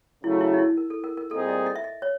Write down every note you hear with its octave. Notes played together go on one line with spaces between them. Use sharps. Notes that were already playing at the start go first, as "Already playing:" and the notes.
F#2 C#3 F#3 A3 E4
E4
D#4
E4
A#4
A4
A#4
A#4
A#2 G3 C4 D#4 G#4 A4
D#5
D#5
E5
D#5
C#5